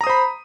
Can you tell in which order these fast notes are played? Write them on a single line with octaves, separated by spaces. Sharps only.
A#5 D#6 C5 B5